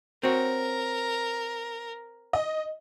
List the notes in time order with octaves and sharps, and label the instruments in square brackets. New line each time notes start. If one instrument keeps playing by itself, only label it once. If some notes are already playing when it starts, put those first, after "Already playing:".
[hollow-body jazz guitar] C4 F#4 C#5 [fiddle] A#4
[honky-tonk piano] D#5